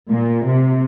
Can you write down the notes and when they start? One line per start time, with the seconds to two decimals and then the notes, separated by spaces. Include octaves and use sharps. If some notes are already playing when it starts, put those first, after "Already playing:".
0.10 A#2
0.45 C3